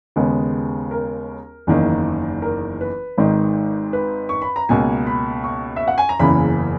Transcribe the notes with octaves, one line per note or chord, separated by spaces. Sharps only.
D#2 C#3 G#3 B3
A#4
F#1 E2 D#3 A#3
A#4
B4
G#1 G#2 D#3
B4
C#6
B5
A#5
C#2 B2 A#3 G#5
B5
C#6
E5
F#5
G#5
A#5
F#1 E2 C#3 E3 A#3 B5